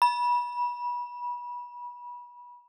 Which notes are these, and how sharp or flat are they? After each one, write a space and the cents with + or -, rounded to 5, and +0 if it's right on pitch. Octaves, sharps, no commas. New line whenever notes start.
B5 -25